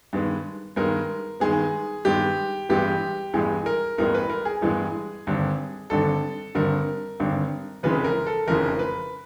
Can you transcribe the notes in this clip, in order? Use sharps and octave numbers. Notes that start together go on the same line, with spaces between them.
G2 D#3 G#3 B3
G2 D#3 G#3 B3 A#4
G2 D#3 G#3 B3 G#4
G2 D#3 G#3 B3 G4
A1 G2 E3 G#3 B3 G4
A1 G2 E3 G#3 B3 G#4
A#4
A1 G2 E3 G#3 B3 A#4
B4
A#4
G#4
A1 G2 E3 G#3 B3
G#1 G2 D3
G#1 G2 D3 A4
G#1 G2 D3 A#4
G#1 G2 D3
F1 F2 C#3 E3 G#3 B4
A#4
A4
F1 F2 C#3 E3 G#3 A#4
B4